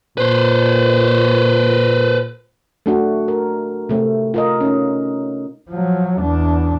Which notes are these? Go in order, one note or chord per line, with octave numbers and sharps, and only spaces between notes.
A#2 B4 C5
A3 D4 F#4
A#4
C3 A3 C4
F4 A#4 D#5
C#4 D#4
F3 F#3
E2 D4